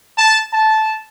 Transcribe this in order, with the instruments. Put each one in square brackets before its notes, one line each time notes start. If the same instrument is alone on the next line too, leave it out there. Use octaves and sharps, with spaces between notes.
[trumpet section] A5
A5